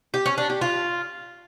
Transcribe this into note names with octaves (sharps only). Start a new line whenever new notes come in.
G4
C#4
D4
G4
F4